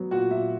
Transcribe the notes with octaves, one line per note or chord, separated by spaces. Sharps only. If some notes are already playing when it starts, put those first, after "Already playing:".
Already playing: F#3 B3
A#2 F#4 F#5
A#2 E5